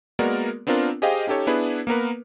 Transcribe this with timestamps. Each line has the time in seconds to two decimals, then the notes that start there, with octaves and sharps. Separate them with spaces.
0.19 G#3 A#3 B3 F#4 A#4 D5
0.67 B3 C4 D4 F4 A#4
1.02 G4 G#4 C5 D#5 F5 G5
1.27 C#4 D#4 G4 A4 C#5
1.47 B3 D4 E4 G#4 B4
1.87 A#3 B3 A#4 B4